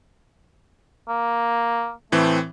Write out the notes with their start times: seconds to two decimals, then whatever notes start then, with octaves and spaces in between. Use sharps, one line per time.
1.09 A#3
2.12 A2 E3 A3 C4